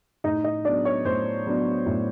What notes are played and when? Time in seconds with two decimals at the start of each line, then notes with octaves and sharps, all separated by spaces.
0.24 A2 D#4 D#5
0.44 D#4 D#5
0.65 F#3 B3 D4 D5
0.85 C#5
1.05 A2 C5
1.46 F#3 B3 D4
1.86 A2